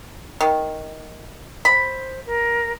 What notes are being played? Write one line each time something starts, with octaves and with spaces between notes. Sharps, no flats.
D#3
C5 B5
A#4